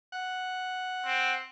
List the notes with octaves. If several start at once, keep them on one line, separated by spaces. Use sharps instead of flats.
F#5
C4